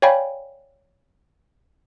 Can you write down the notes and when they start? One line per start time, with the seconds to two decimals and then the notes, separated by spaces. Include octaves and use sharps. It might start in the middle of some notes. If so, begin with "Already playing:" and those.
0.02 C#5 D5 F5 G5 G#5 B5